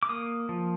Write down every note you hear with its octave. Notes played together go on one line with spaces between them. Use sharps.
D6
A#3 D#6
F3